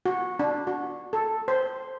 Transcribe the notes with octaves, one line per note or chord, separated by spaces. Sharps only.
F#4
D4
F#4
A4
C5